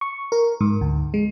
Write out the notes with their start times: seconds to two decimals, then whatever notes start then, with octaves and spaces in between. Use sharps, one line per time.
0.01 C#6
0.32 A#4
0.61 G#2
0.81 D2
1.14 G#3